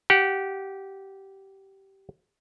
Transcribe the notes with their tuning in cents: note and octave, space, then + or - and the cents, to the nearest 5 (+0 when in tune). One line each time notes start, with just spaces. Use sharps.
G4 -15 F#5 +0